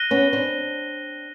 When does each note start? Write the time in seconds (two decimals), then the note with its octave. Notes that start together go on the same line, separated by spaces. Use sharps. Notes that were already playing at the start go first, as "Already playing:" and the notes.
Already playing: F#6 A#6 D#7 G7
0.11 B3 C#4
0.33 C4 D4